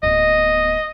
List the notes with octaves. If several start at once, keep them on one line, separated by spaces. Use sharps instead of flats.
D1 B3 D#5